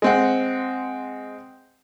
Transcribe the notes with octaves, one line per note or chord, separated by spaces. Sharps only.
G#3 C4 F#5